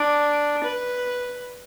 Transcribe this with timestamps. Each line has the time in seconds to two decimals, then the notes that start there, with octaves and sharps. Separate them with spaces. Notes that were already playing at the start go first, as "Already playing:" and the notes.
Already playing: D4
0.64 B4